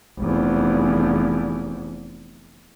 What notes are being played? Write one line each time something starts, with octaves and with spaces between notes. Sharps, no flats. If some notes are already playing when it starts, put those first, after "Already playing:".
F1 E2